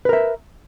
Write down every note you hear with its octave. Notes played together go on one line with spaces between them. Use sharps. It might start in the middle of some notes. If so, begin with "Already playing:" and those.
A#4 B4 E5